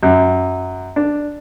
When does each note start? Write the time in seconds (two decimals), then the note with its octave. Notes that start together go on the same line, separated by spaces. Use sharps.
0.03 F#2
0.96 D4